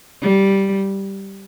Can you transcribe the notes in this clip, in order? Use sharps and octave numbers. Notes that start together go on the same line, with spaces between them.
G3